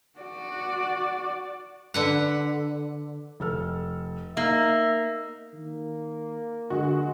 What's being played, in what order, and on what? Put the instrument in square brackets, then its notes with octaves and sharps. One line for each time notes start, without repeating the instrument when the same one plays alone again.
[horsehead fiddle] F#4 D5
[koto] D3 B4 F#5
[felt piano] F1 A4 F6
[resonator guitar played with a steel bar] A#3 [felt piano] D#4 [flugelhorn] E5
[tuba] D#3 [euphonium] A#3
[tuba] D3 [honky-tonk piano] F#3 G#3 F#4